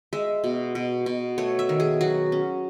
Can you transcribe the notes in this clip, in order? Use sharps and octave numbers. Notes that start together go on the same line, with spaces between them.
G#3 E5
B2
B2
B2
A3 C#5
E5
D#3
G#4
F#3 F#4
C#4